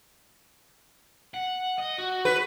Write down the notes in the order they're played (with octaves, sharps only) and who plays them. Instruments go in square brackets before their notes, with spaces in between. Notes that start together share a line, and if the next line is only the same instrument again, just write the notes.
[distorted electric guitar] F#5
D#5
F#4
[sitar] B4